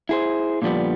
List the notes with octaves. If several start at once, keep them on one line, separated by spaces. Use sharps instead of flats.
E4 G#4 C5
A#2 D3 F3 G3 B3